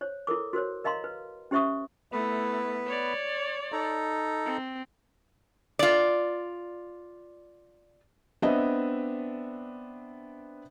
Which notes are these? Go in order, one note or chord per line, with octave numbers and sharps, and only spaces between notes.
C5 C#5
E4 A4 A#4 D6
F#4 A#4 C5 C#5
A#4 D#5 F5 A#5 C6
B4
C#4 G4 C5 E5 C#6 D#6
A3 B3 E4 B4
C#5 D5
D#4 A4 A#5
C4
F4 D5
B3 C4 D4 D#5 E5